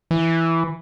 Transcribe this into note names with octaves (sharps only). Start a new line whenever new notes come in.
E3